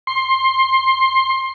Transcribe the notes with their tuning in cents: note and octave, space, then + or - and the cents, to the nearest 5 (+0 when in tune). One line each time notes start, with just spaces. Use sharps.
C6 +20